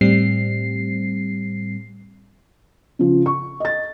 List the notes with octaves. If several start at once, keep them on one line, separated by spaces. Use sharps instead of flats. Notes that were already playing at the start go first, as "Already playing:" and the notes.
A2 G3 C4 C7
C#3 F3
C#6
D#5 A6